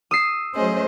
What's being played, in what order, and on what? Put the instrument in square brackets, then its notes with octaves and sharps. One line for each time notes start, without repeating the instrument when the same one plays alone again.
[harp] D#6 E6 C7
[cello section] F#3 A3 C5 [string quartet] C#4 G#4 D#5